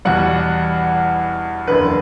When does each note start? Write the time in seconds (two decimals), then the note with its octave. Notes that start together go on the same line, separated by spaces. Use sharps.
0.05 E2 B2 G3 F#5
1.67 F#1 E2 D3 B4